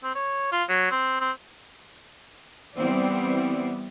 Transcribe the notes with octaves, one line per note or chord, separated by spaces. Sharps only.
C4
C#5
F4
F#3
C4
C4
E3 G3 B3 C4 E4 D5